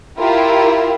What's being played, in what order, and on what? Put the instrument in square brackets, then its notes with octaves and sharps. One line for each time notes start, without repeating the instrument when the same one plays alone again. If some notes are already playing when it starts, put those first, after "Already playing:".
[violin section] E4 F4 G4 A#4